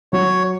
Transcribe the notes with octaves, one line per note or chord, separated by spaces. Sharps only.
F#3 C#5